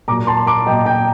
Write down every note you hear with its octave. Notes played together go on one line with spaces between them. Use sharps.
A#2 F#3 A#5 D6
A5 C6
A#5 D6
A#2 F#3 D#5 G5
G5 A#5